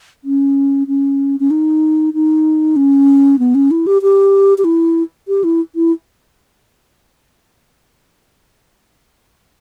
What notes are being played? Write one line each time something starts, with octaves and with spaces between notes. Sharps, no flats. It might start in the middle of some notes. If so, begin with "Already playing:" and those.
C#4
C#4
C#4
D#4
D#4
C#4
B3
C#4
E4
G4
G4
G4
E4
G4
E4
E4